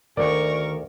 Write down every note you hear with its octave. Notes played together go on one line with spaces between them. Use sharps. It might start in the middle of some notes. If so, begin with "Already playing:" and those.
D2 D#3 A#4 D5 C#6